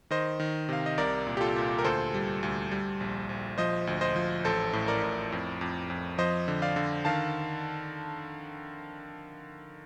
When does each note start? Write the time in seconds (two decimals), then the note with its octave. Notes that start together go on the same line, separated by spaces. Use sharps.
0.11 D#3 C5 D#5
0.40 D#3
0.69 C3 F5
0.86 D#5
0.98 C2 A#4 D5
1.27 A#2
1.37 G4
1.41 F4 A4
1.56 A#2
1.79 A#4
1.84 D2 A4 C5
2.14 G3
2.43 D2
2.71 G3
3.00 A#1
3.29 A#1
3.58 F3 C5 D#5
3.87 D2
4.01 C5 D#5
4.16 F3
4.45 A1 A4 C5
4.73 A2
4.88 A#4 D5
5.03 A2
5.32 F2
5.61 F2
5.90 F2
6.18 F3 C5 D#5
6.48 D3
6.62 D5 F5
6.76 D3
7.05 D#3 F5 A5